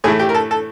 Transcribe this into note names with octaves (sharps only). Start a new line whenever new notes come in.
A2 E3 A3 G#4
G4
A#4
A4
A4